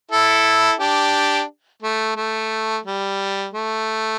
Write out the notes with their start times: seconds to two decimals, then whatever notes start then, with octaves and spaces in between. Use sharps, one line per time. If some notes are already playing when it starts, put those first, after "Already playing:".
0.11 E4 A4
0.80 D4 G4
1.82 A3
2.16 A3
2.86 G3
3.53 A3